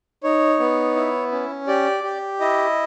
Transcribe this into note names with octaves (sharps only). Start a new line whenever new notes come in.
D#4 C#5
B3
E4
C#4
G4 D5
G4
E4 D#5